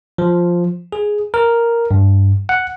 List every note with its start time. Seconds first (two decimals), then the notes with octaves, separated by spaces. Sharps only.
0.18 F3
0.92 G#4
1.34 A#4
1.91 G2
2.49 F#5